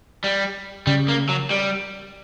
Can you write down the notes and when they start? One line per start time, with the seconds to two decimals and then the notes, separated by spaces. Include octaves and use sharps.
0.24 G3
0.87 C#3 G3
1.08 A#3
1.29 F#3
1.51 G3